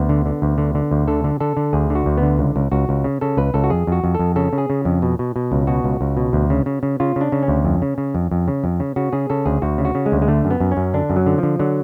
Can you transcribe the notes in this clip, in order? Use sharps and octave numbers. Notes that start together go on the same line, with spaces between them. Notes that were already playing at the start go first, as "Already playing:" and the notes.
Already playing: D2 B3
D3
D3
D2
D3
D3
D2
D3 A4
D3
D3 A4
D3
D2 G#4
D3
F#4
D2
B3
D3
C#2
C#2
C#2 F#4
C#2
C#3
C#3 A4
C#2 B4
C#2 A4
F#4
F2 G#4
F2 F#4
F2
F2 A4
C#3 A4
C#3
G#4
C#3
F2
B2
B2
B2
C#2
B2 F#4
C#2
C#2
B2
D2
C#3
C#3
C#3
C#3 F4
C#3 D4
C#3
C#4
D2
F2
C#3
C#3
F2
F2
C#3
F2
C#3
C#3 F#4
C#3 G#4
C#3 A4
D2 G#4
D2 F#4
C#3
F#4
C#3
G#3
D2
G#3
D3 A3
F#2
B3
F#2
C#4
F#2
D3 D4
F#2
F#3
D3
F3
D3
D3 F#3